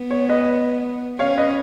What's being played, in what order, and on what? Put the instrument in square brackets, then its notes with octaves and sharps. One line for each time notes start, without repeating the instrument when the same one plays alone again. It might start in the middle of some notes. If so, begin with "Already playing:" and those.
Already playing: [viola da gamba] B3
[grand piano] C#5
B4 D#5
[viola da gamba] C#4 [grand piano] C#5 F5
[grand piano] B4 D#5